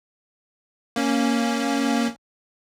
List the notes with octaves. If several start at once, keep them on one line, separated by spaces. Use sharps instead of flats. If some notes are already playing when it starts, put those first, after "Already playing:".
A#3 C#4